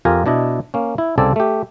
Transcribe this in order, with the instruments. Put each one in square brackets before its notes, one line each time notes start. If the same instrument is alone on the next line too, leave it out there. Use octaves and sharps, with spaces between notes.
[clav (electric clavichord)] F2 F4 G4 A#4 G#5 A#5
B2 D4 E4 D#5
A#3 C#4
E4
C2 C#3 C4 A4 D5 G#5
A3 G4